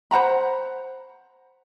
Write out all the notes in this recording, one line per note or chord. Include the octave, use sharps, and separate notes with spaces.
C5 F#5 A#5 B5